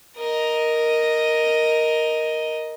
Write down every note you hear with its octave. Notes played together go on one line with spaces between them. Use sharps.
A#4 D#5